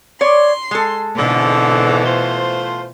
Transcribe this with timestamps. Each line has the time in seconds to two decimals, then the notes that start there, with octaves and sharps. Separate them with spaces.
0.21 C#5 D5 C6
0.71 G#3 A4
1.16 F2 G#2 B2 D3 E3
2.04 A3 F4 C5